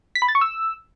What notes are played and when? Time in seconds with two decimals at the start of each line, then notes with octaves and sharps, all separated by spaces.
0.15 B6
0.22 B5
0.28 A6
0.35 C#6
0.41 E6